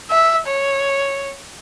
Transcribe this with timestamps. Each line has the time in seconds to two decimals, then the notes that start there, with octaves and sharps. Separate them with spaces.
0.11 E5
0.47 C#5